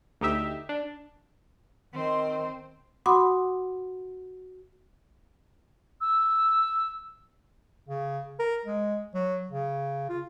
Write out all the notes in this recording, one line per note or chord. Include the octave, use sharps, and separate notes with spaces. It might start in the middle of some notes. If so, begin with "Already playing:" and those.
D2 D#4 G4 E5
D4
D#3 C4 C5
F#4 F#5 B5 C6 D6 D#6
E6
C#3
A#4
G#3
F#3
C#3
F4